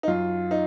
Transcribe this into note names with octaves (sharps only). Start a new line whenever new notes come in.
D#4
F#2 F4
D#4